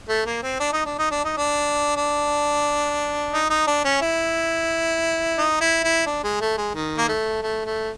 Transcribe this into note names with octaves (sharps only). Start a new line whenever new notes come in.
A3
A#3
C4
D4
D#4
D4
D#4
D4
D#4
D4
D4
D#4
D#4
D4
C#4
E4
D#4
E4
E4
D4
G#3
A3
G#3
D#3
A#3
A3
A3
A3